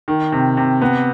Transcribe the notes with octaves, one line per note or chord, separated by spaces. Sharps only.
D#3
C3
C3
B3